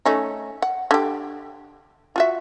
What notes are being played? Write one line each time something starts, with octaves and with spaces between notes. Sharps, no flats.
A3 C#4 D#4
F#5
D3 G4
F4 F#4 E5